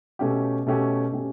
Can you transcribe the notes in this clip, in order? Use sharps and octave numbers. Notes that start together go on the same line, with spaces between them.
B2 A3 C#4 G4
B2 A3 C#4 G4
B2 A3 C#4 G4